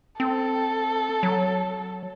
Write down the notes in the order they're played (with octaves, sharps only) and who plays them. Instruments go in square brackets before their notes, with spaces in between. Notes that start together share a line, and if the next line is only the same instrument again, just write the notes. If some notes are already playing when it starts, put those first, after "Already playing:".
[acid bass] C4 [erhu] A4
[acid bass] F#3